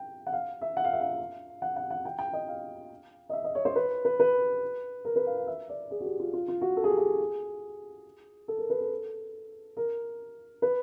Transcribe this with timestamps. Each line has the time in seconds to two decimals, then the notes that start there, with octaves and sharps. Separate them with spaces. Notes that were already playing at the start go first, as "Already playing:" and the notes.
Already playing: G5
0.27 F#5
0.33 F5
0.61 E5
0.77 F#5
0.84 F5
0.93 E5
1.01 F5
1.62 F#5
1.76 F#5
1.90 F#5
2.05 G5
2.19 G5
2.33 D#5
2.48 F5
3.29 D#5
3.33 E5
3.44 D#5
3.55 C#5
3.65 C5
3.76 B4
4.05 B4
4.20 B4
5.05 A#4
5.16 B4
5.26 F5
5.37 F5
5.47 E5
5.69 D5
5.91 G#4
6.00 F#4
6.05 G4
6.20 F4
6.33 F4
6.48 F4
6.62 F#4
6.77 A4
6.84 G#4
6.90 G4
6.97 G#4
8.48 A4
8.58 A#4
8.70 B4
8.81 A4
9.77 A#4
10.62 B4